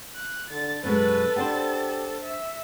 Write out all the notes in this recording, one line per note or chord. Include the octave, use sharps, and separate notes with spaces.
F#6
D3 A6
F#2 B2 G#3 A4 B4 A6
B3 D4 G4 C5
E5